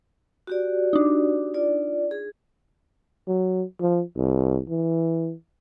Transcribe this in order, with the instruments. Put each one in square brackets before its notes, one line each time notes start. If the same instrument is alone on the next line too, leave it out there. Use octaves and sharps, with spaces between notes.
[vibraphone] F#4 G4 D5
[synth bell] D4 D#4
[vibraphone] F4 D5
G#4
[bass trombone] F#3
F3
C2
E3